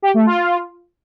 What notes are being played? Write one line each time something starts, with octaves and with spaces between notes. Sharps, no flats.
G4
A3
F4